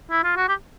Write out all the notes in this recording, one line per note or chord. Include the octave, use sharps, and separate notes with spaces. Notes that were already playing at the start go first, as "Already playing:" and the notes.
E4
F4
F#4
G4